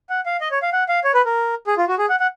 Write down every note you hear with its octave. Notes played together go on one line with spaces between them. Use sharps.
F#5
F5
D#5
C#5
F5
F#5
F5
C#5
B4
A#4
G#4
F4
F#4
G#4
F#5
F#5